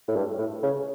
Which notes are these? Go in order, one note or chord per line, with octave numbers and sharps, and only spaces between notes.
A2
G2
A2
C#3